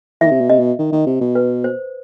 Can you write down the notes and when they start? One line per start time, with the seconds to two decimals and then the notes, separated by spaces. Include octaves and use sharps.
0.21 E3 E5
0.26 D#3
0.31 C3
0.40 B2
0.50 C3 D#5
0.59 B2
0.78 D#3
0.92 D#3
1.06 C3
1.21 B2
1.35 B4
1.64 C5